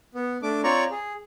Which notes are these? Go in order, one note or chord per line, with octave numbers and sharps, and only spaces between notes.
B3
A3 D4 D6
C4 F4 C#5 D5 A#5 C#6
G#4